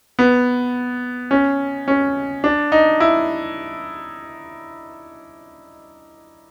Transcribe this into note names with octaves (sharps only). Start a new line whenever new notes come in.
B3
C#4
C#4
D4
D#4
E4